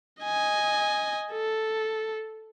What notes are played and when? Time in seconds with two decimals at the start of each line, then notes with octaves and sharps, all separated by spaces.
0.23 D#5 G#5
1.32 A4